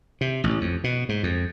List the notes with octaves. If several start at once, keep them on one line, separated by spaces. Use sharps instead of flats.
C3
A1
F2
B2
G#2
F2